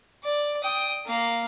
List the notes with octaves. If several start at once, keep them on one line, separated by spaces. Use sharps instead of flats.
D5
G5 D#6
A#3 F5